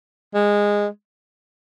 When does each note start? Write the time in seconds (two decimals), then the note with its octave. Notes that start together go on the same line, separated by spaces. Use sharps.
0.34 G#3